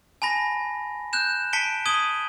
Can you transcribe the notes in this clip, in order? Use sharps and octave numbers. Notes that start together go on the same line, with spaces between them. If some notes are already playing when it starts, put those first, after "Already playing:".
G#5 A5 B5 A#6
F#6 G6 E7
A5 B6 C#7 D7 G7
D#6 G#6 D#7 F#7 G7